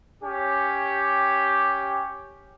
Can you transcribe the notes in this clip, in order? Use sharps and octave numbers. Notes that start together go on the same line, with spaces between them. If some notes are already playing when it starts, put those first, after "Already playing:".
C#4 G4